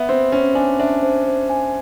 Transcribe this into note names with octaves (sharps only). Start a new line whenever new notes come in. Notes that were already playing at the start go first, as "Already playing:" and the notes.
Already playing: B3 E5
C4 C5
C#4 C5
D4 G#5
D4 E5
C5
C5
G#5